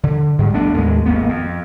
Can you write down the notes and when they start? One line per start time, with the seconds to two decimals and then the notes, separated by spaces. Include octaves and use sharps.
0.03 D3
0.39 G#2 G3
0.54 A#1 A3 B3 D4
0.74 D#2 A2 G#3
1.06 G#1 A#3 B3
1.29 F2